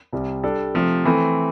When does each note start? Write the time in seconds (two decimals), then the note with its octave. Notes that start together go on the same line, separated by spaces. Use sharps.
0.12 C2 C3 G3
0.44 G3 D4 A4 D5
0.74 C3 F3 A3
1.05 E3 A3 C4